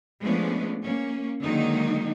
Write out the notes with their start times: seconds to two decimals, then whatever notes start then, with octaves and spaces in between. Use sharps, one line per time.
0.22 F3 G#3 A3 B3 C#4 D4
0.82 A#3 C#4
1.42 D3 D#3 F#3 G#3 A#3 D#4